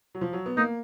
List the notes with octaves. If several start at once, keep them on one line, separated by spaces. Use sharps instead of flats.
F#3
F3
F#3
B3
A#3 D#4